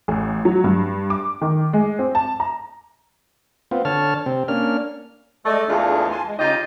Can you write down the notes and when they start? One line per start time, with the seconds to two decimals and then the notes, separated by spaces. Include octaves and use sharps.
0.08 A1
0.45 F#3
0.64 G2
1.10 D6
1.41 D#3
1.73 G#3
1.99 C4
2.15 A5
2.40 A#5
3.71 B3 C4 F4
3.85 D3 C#5 A5 F6
4.26 C3 C4
4.48 A#3 C#4 D4 F6
5.46 G#3 A3 D5 D#5
5.69 E2 G#2 A3 D4 F4 G#4
6.11 G#5 A5 C6
6.27 G#3
6.39 C#3 D#4 F4 G4 D#5 G6